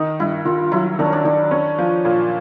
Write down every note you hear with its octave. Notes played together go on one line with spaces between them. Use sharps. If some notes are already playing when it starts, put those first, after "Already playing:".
Already playing: D#3 D#4
G2 E4
D#3 F4
F#3 E4
D#3 D4
C#4
D4
D#3 D4
C#4
F3
A#2